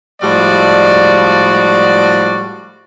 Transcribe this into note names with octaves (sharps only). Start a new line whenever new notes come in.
A2 F3 G3 G#3 F#4 D5